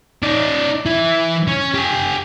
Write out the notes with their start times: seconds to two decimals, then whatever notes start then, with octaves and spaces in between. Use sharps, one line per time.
0.23 D#4 D5
0.86 E3 E4
1.48 C#4
1.75 G4 G#5